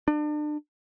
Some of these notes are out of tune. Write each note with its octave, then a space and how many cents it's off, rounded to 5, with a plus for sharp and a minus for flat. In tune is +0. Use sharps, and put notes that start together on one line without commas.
D4 +35